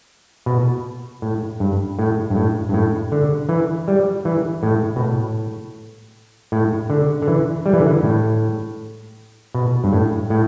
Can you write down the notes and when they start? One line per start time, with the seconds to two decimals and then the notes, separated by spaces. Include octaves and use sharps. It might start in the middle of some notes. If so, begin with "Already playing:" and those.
0.46 B2
1.22 A2
1.60 G2
1.99 A2
2.30 G2
2.36 A2
2.69 G2
2.74 A2
3.12 D3
3.49 E3
3.88 G3
4.25 E3
4.63 A2
4.96 B2
5.01 A2
6.52 A2
6.90 D3
7.22 D3
7.28 E3
7.66 G3
7.73 E3
7.80 D3
7.87 E3
8.03 A2
9.54 B2
9.84 G2
9.93 A2
10.30 A2